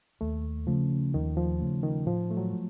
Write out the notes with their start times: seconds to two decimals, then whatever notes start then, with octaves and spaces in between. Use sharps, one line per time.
0.21 D#2 A3
0.67 C#3 F3 A3 C#4
1.14 D#2 D#3
1.37 F3
1.60 C#3 A3 C#4
1.83 D#3
2.06 A2 F3
2.30 A3
2.37 F#3
2.53 A3